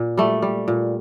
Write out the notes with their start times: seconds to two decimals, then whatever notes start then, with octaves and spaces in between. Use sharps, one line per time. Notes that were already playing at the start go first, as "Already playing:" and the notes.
Already playing: A#2
0.17 G3 A3
0.42 G3
0.68 A#2